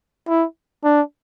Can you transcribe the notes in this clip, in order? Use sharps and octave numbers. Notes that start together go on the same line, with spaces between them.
E4
D4